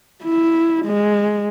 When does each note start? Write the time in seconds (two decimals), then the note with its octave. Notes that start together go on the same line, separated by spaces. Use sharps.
0.24 E4
0.85 G#3